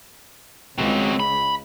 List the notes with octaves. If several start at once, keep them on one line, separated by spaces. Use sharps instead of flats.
C#2 C4 F#4
B5